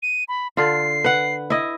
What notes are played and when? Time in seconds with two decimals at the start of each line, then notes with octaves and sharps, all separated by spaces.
0.03 D#7
0.28 B5
0.57 D3 F4 C7
1.04 B4 F#5
1.50 E4 D#5